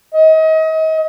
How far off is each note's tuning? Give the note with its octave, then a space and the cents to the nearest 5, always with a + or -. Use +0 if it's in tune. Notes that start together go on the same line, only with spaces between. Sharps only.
D#5 +35